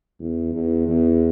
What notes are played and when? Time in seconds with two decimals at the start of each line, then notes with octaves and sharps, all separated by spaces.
0.20 E2
0.54 E2
0.87 E2